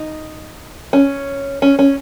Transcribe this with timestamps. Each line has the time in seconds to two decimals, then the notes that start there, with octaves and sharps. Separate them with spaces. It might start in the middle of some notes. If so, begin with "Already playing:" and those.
Already playing: D#4
0.93 C#4
1.62 C#4
1.79 C#4